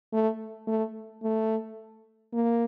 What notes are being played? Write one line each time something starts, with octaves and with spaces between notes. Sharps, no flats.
A3
A3
A3
A#3